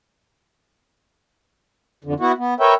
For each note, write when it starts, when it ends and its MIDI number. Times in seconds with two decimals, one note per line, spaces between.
2.04 2.14 41
2.04 2.14 50
2.20 2.32 59
2.20 2.32 64
2.20 2.32 66
2.38 2.54 59
2.60 2.74 70
2.60 2.74 71
2.60 2.74 73
2.60 2.74 76
2.60 2.74 79